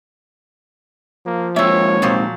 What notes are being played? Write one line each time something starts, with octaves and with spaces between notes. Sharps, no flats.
F3 A#3
D#2 G#3 C4 C#5 E5
A#2 F3 F#3 C4